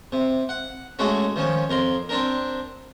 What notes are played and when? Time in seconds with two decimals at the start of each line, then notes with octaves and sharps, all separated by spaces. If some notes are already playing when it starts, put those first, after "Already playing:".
0.12 C3
0.49 F#5
0.99 G#3 A3 C#4 F#4
1.36 D#3 F3 C#4
1.70 F2 A#4 C6
2.09 C4 D4 A#4